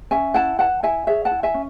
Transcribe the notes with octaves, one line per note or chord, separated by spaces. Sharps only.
C#4 E5 G#5
E4 F#5 A5
B4 F#5 A5
E4 E5 G#5
G#4 C#5 E5
F#5 A5
E4
E5 G#5
C#4